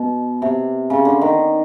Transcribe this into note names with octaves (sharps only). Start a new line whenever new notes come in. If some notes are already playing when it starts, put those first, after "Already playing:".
Already playing: B2
C3
C#3
D3
D#3